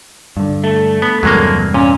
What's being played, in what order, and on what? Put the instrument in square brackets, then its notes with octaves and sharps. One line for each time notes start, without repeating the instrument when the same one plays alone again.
[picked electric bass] G2 D3
[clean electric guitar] A3
[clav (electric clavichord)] B3
[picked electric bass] E2 G2 C3 [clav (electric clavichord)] F#3 G#3 A#3
[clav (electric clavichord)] A#2 [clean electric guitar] C#4